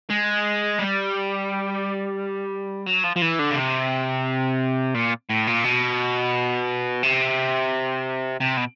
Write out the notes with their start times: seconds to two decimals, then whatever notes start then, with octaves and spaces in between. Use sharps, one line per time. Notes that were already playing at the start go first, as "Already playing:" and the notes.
0.10 G#3
0.79 G3
2.87 F#3
3.04 F3
3.16 F3
3.22 E3
3.39 D3
3.51 C#3
3.56 C3
4.95 A#2
5.29 A2
5.47 A#2
5.64 B2
7.03 C3
8.40 C3
8.57 B2